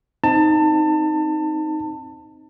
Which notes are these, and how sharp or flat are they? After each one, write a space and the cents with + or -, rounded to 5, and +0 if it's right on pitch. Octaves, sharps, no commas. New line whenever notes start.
C4 +0 D#4 +0 A5 +25